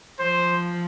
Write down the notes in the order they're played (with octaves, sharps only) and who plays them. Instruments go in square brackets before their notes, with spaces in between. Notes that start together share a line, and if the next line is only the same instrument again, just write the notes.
[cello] F3 [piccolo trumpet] C5